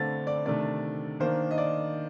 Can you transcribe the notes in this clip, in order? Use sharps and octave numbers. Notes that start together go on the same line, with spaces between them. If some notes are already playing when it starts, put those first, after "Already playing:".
Already playing: D3 A3 C4 A6
D5
C3 D#3 A3 D4 D5
D#3 A#3 D4 C5
D#5
D5